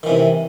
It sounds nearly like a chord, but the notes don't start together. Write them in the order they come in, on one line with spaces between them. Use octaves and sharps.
D#3 E3 C3